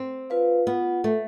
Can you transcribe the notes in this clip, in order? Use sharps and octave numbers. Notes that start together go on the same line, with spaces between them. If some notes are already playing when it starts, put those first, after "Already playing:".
Already playing: C4
F4 B4 F5
B3 F4
A3 A4 E5